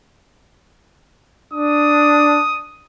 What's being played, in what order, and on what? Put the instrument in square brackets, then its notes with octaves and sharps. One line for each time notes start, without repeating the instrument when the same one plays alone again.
[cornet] D4 [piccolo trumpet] D#6